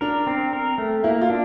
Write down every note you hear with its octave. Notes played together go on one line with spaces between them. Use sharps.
D4 A#4
C4
A#4
A3
A#3 E4
F4
D4